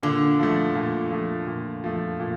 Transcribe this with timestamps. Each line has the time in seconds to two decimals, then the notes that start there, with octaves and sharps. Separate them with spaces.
0.03 A#2 D3
0.39 F3 A3
0.75 A#2
1.11 F3 A3
1.47 A#2
1.84 F3 A3
2.20 A#2